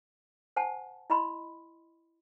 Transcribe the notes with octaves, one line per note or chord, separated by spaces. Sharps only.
C5 F#5 G#5 A5
E4 D#5 B5 C6